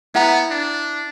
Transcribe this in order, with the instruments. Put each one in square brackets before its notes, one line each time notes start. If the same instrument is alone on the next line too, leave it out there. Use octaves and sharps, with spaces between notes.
[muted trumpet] B3 [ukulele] E4 F#5 A#5
[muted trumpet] D4